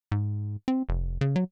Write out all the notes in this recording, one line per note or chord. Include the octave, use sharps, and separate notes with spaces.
G#2
C4
F1
C#3
F#3